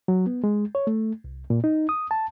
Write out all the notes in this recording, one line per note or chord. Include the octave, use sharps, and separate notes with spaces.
F#3
B3
G#3
C#5
A3
C2
A#2
D#4
D#6
A5